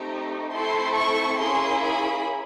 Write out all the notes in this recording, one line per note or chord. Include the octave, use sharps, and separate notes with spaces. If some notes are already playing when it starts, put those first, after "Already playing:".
Already playing: A3 C4 D#4 G4
A3 C4 E4 A4 C6
C#6
A#3 C#4 E4 G#4 C6
B5